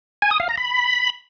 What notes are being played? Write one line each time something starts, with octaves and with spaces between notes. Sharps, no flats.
G#5
D#6
F5
A#5
B5